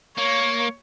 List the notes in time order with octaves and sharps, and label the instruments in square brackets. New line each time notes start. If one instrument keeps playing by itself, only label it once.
[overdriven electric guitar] A#3 [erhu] C#5